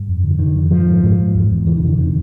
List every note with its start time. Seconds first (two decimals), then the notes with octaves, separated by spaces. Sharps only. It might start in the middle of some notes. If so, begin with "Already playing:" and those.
Already playing: G2
0.08 F2
0.23 D3
0.39 D3 D#3
0.55 F2
0.71 G#2 F3
0.87 G#2
1.04 G#2
1.19 G#2
1.34 E2
1.50 E2
1.66 C3 E3
1.77 D#3
1.83 F2 D3
1.97 C3 D#3